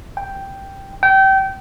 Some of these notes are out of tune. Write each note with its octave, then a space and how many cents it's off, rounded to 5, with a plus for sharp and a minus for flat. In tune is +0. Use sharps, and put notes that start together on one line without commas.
G5 +0
G5 -25